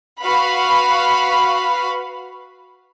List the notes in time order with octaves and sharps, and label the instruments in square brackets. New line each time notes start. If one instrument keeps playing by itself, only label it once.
[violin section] F#4 B4 F5 B5